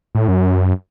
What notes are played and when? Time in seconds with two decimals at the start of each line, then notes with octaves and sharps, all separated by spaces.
0.15 A2
0.28 F#2